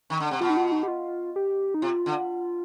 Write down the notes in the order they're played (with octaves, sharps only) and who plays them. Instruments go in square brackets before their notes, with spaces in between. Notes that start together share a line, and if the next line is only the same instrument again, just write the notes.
[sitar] D#3
D3
C3
[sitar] B2 [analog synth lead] F4
[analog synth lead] D#4
F4
D#4
G4
F4
G4
D#4
[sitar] C3 [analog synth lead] F4
[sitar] D3